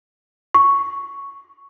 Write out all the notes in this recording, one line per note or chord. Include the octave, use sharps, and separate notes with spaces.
C#6